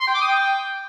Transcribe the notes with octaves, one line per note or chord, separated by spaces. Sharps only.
C6
G5
D6
D#6
G5